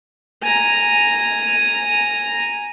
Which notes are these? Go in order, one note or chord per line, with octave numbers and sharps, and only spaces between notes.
G#5 A#5